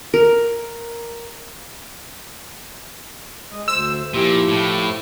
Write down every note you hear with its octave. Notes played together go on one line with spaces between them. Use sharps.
A#4
G#3 D#5
D2 C5 E6
A#2 F3 E4 G4
A2